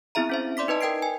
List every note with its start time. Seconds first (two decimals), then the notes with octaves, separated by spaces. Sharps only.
0.15 B3 C4 E4 G#4 E5 A#5
0.30 C#4 C5 E5
0.57 D5 C6 D6 B6
0.68 D#4 B4 D#5 A5
0.81 A#4 G5 G#6 C7 D7
1.02 G#5